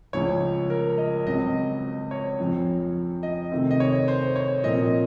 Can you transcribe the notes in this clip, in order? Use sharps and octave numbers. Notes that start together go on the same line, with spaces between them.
C#2 C#3 F3 C#5
A#4
D#5
C#2 C#3 F#3 C4 D#5
C#5
F2 C#3 F3 C4
D#5
C3 D#3 A3 C4
D#5
C#5
C5
C#5
A#2 F3 C4 D#5